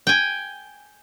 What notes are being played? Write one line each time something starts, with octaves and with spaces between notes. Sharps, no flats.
G5 G#5